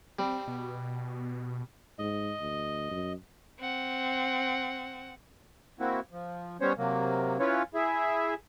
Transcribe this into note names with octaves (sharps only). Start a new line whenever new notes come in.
G3 C4
B2
G#2 D#5
D2
F#2
C4 F#5
A#3 C4 E4 F#4
F3
G3 B3 C#4 C5 C#5
C3 F#3 A#3
C#4 E4 F4 B4 C#5
E4 G#4 E5